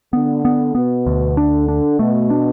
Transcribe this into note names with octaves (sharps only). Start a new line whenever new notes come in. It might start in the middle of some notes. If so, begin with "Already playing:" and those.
D3 B3
B3
B2 B3
D2
D3 D4
D4
B2 A3
D4